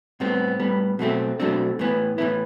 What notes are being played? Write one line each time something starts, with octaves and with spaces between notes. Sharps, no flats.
A2 G3 B3 C4
A2 G3 B3
B2 F#3 A3 C4
B2 F#3 A3 C4 D4
A2 E3 B3
A2 E3 B3 E4